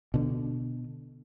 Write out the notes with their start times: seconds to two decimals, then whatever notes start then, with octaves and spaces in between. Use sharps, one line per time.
0.14 B2 D3